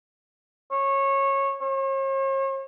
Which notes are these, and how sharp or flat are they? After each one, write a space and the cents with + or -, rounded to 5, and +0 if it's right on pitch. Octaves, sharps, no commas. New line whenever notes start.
C#5 -20
C#5 -45